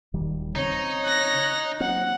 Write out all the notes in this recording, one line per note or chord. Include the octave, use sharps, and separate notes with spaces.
D#1 D#3 G3
C#3 C4 D#4 C#5
F#6 A#6
F#3 A#3 C4 F#5